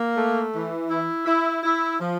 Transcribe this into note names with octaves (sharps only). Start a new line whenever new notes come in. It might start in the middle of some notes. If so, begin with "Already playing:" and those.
Already playing: A#3
A3
E3
E4
E4
E4
F3